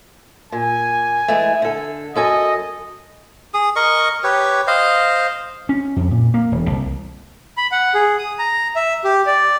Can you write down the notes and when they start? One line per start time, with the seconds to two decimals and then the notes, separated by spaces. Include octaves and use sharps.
0.52 A#2 G#5
1.28 E3 G#3 A3
1.62 D3 A4
2.16 F#2 A4 D#5 G#5
3.54 G#4 D#6
3.76 A#4 D#5 C#6
4.24 G4 B4 C#5
4.67 C5 D#5 F5
5.69 C#4
5.96 F2
6.11 A#2
6.34 A#3
6.52 E1
6.70 C2
7.57 B5
7.72 F#5
7.94 G#4
8.19 D#6
8.39 A#5
8.76 E5
9.04 G4
9.26 D5